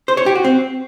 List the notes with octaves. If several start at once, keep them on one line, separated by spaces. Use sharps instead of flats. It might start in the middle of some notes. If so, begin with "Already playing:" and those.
C5
C#5
G4
F#4
C4